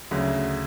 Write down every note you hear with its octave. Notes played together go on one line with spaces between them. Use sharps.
D2 C#3 F#3